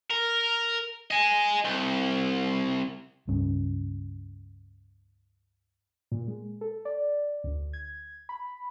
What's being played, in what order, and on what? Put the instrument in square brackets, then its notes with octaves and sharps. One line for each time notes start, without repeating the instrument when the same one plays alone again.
[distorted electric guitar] A#4
D#5 G#5
C2
[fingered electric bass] C#2 G2 C#4
[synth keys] A#2
G#3
A4
D5
D2
G#6
B5